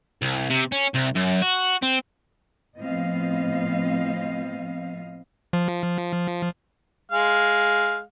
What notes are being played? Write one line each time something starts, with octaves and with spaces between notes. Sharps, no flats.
C2
C3
C#4
C2
F#2
F#4
C4
A2 F3 B3 C4 D#5 F5
F3
G#3 F5